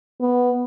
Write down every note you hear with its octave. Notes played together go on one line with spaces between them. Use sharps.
B3